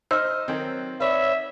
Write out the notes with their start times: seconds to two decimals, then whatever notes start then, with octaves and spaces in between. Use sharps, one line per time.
0.11 D#4 C5 D#5 E6 F6
0.48 D#3 F#3 C4
1.00 B4 C#5 D5 E5